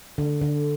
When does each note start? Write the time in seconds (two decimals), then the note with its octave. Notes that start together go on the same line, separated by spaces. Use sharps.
0.18 D3
0.41 D3